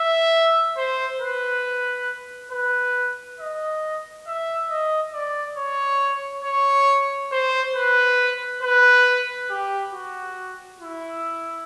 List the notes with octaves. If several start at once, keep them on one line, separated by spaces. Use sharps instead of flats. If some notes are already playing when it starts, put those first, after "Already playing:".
Already playing: E5
C5
B4
B4
D#5
E5
D#5
D5
C#5
C#5
C5
B4
B4
G4
F#4
E4